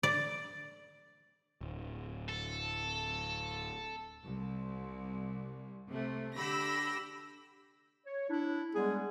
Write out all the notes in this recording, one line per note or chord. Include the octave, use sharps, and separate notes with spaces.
D5
D1
A4
C2
C3 A3
D3 G4 B5 E6 A#6
C#5
D4 E4
G3 G#3 B3 G#4